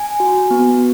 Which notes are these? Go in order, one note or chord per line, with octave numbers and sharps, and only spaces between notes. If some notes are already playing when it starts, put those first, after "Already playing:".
Already playing: G#5
F#4
B3